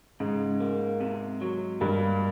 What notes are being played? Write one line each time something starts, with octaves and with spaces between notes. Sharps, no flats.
G#2 C#3
A#3
C3
F#3
G2 A#3